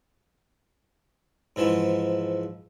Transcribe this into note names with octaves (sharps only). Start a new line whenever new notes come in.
G#2 E3 F3